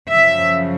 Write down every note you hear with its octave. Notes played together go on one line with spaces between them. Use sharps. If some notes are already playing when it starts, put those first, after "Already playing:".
F#2 C#3 F3 E5